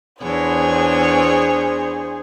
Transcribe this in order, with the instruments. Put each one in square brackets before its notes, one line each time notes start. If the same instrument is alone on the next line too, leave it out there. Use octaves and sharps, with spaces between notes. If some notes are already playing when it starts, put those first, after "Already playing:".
[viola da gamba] E2 D4 C#5 [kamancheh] G#4 C5